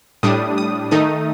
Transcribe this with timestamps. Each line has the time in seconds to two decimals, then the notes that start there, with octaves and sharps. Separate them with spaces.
0.23 A2 G3 D4 D#6
0.58 D#6
0.91 D#3 A3 D#4 D#6